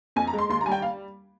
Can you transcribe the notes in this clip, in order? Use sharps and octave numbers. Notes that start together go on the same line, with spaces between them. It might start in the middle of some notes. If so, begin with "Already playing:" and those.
F2 G#5
A#5
G#3
C6
D#2 C6
A#5
G3 G#5
G5
F5